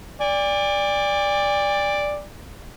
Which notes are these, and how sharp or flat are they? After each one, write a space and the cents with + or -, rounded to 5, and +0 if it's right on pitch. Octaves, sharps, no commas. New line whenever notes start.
D5 +0 G#5 -45